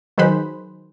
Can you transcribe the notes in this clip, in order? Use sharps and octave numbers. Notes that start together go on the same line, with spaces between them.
D#3 F#3 G#4 B4 C5 B5